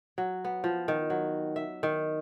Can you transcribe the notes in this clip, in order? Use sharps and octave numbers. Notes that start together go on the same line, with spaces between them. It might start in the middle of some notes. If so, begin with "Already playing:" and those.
F#3
B3
F3
D#3
F#3
E5
D#3